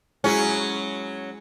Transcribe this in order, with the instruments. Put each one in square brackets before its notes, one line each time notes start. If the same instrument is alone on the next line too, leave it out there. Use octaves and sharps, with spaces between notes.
[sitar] F#3 C#4 [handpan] G#3 E4 G#4